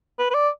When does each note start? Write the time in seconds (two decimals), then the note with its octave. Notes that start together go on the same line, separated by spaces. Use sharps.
0.19 B4
0.30 B4
0.34 D5